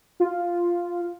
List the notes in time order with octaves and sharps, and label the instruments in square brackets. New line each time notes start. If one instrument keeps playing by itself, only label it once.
[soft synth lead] F4